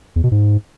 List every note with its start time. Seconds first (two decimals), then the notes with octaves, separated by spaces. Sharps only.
0.16 E2
0.24 B2
0.31 G#2